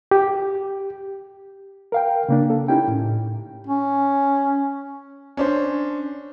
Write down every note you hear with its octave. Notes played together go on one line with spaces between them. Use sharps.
G4
A#4 F5 G5
C#3 A#3 D4
A4
C#4 D#4 E4 G4 G5
A2
C#4
C#4 D4 C5